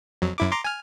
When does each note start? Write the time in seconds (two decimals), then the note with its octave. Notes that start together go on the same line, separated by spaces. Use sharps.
0.22 F2 F#3
0.38 F#2 E4 D6
0.51 A#5 C6 D6
0.64 G#5 F6